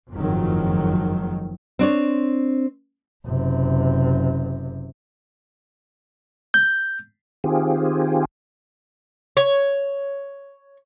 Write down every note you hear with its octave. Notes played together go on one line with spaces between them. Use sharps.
F#1 F2 G#2 D#3 F#3
C4 D4 C#5
F#1 C3
G6
D#3 C4 F4 G4 G#4
C#5